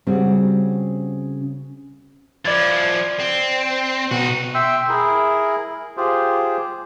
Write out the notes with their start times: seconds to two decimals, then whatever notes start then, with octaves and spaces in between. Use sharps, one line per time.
0.07 C#3 G3 C4 F#4
2.45 F3 E4 D5 G#6 A6
3.20 C4
4.11 B2 D#4 F#4
4.54 E5 G5 C6 E6
4.89 E4 G#4 A#4
5.97 F4 G4 G#4 C5